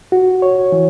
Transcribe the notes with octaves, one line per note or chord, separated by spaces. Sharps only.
F#4
C#5
E3